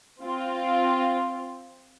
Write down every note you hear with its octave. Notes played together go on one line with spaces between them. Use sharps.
C4 F4